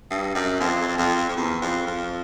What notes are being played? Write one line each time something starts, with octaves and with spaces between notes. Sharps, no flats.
G2
F#2
F2
F2
F2
E2
F2
F2